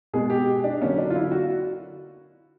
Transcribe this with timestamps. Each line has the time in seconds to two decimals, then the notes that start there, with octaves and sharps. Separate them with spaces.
0.13 B2 G#3 B3 G#4
0.30 G4
0.64 D4
0.81 D3 F#3 A#3 C#4
0.98 D4
1.10 F4
1.15 E4
1.32 F#4